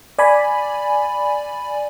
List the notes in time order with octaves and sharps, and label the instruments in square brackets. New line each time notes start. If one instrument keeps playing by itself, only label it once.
[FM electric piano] D5 G#5 B5